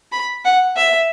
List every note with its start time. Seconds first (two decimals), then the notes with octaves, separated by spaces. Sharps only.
0.12 B5
0.45 F#5
0.76 E5